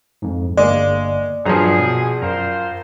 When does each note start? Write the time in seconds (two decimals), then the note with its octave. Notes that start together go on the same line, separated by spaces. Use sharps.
0.22 F2 G#2
0.57 G1 G#3 A#3 D5
1.46 A#1 G2 F3 F#3 G#4 A#5
1.79 B2
2.22 F#2 F4 A#4 C5